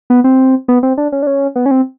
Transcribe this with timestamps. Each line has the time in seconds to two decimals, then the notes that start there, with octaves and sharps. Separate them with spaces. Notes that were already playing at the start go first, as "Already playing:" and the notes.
0.10 B3
0.24 C4
0.68 B3
0.83 C4
0.98 D4
1.12 C#4
1.23 D4
1.27 C#4
1.56 B3
1.66 C#4
1.71 C4